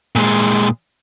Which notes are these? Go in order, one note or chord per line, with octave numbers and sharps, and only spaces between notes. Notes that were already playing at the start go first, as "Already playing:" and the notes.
A#2 G#3